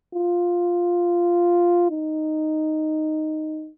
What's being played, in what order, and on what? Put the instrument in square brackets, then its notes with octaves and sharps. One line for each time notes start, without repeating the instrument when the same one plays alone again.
[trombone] F4
D#4